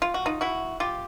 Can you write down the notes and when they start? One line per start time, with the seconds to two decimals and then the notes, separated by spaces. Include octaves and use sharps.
0.02 F4
0.14 F#4
0.26 D#4 F4
0.41 E4 F#4
0.80 F4 G4